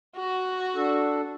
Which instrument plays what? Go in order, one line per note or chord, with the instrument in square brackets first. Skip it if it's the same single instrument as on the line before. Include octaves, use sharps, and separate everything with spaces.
[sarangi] F#4
[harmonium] D4 A4